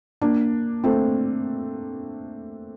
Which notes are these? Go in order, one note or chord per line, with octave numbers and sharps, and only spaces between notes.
A#3 D4
A3 C4